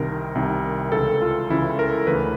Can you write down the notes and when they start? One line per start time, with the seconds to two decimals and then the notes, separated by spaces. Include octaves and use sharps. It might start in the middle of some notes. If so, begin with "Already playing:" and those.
Already playing: C2 C3 D#3 A#4
0.35 C2 C3 D#3
0.92 C#2 C#3 E3 A4
1.22 F4
1.50 C#2 C#3 E3 E4
1.79 A#4
2.07 D2 C#3 E3 B4